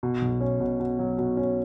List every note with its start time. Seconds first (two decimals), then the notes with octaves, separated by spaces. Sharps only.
0.03 B2
0.22 B1
0.41 C#4
0.60 B2
0.80 B2
0.99 F#3
1.18 B2
1.37 C#4